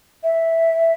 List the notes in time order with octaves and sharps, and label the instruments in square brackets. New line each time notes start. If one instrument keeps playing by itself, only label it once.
[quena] E5